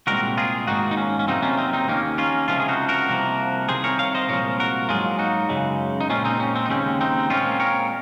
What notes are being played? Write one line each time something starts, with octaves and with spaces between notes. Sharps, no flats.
C2 A#2 G#3 C4 F#4 A#4
F4 G#4
G#2 D#3 A#3 D#4 F#4
D#4
C#4
C#4
F2 C3 F#3 A#3 C4 D#4
C#4 F4
C4 D#4
C4 D#4
D#2 D#3 A#3 C#4
C#4 F4
C#2 C3 F3 G#3 C#4 F4
G#4
D#4 F#4
F#4 A#4
C2 C3 F3 A#3
C2 C3 D#3 G#4 C5
A#4 C#5
C#5 F5
C5 D#5
C2 A#2 F3 G#3 A#4 C#5
F#4 A#4
G#2 F#3 A#3 F4 G#4
D#4 F#4
F#2 C#3 G#3
D#4
A#2 G#3 C4 C#4 F4
C4 D#4
C#4
C4
D#4
D#2 C#3 G#3 C4 C#4
C4 D#4
A#2 G#3 C4 C#4 F4
A#4 C#5